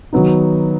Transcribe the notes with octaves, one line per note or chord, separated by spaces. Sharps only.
D#3 F#3 B3 D#4